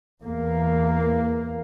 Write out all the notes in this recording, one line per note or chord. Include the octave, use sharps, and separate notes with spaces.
E2 A#3